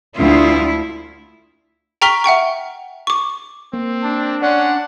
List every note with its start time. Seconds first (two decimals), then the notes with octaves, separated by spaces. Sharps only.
0.18 D2 E4 F4
2.02 G5 A#5 C#6 F6 B6 G7
2.24 E5 F#5 G5 C#6
3.07 C#6 D6
3.73 A#3 C4
4.03 D4
4.42 C#4 D5 F#5 C6